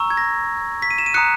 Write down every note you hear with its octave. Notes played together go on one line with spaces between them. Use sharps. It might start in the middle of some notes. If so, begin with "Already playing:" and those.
Already playing: A#5 C#6 E6
G#6
A#6
B6
D#7
E7
D#7
A#5 D#6 F#6 C#7